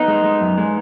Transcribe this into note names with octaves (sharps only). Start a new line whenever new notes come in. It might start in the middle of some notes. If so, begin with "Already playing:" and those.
Already playing: B3 D#4
G#3
G#3
F#2
G#3